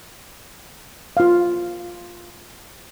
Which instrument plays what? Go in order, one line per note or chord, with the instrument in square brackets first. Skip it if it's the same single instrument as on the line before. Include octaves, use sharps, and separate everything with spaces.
[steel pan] F4 F5